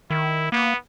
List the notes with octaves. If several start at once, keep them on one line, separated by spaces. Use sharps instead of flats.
D#3 E4
A#3 B3